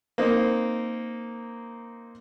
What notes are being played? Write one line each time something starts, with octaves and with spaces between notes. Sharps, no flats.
A#3 C4 D#4